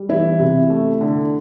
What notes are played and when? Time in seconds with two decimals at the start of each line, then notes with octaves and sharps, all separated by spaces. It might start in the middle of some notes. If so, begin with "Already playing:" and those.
Already playing: G3
0.09 E3 E4
0.39 C3
0.70 A3
1.01 D3